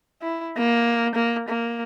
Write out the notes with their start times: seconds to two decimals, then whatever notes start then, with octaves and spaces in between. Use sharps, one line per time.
0.22 E4
0.58 A#3
1.15 A#3
1.49 A#3